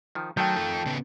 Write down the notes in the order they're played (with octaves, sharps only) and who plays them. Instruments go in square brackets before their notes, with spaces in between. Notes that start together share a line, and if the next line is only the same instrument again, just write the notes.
[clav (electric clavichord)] D#3 F3
[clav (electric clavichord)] D#3 A3 [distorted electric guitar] F#3 [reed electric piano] G5 A5 G6
[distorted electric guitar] F4 A4
C#3 B3